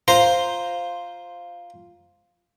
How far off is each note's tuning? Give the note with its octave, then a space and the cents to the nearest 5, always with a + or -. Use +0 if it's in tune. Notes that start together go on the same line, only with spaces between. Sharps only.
F4 +0 C5 +0 A#5 +0